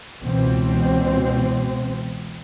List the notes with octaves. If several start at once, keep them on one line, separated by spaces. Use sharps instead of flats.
C#2 B2 E3 C4